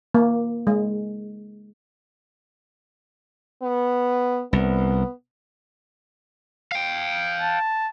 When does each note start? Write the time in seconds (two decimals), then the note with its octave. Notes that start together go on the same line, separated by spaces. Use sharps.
0.14 A#3
0.67 G#3
3.62 B3
4.53 C2 B3
6.72 F5 G5
7.40 A5